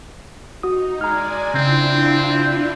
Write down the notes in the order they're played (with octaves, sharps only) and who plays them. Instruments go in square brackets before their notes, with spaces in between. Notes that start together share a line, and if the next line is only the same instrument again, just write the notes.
[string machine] D#4 [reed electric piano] F#4 D#6
[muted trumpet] G#3 [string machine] D5 G#5 [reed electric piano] A#5 F6
[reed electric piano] C#3 [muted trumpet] C4 [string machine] D4 E4 F4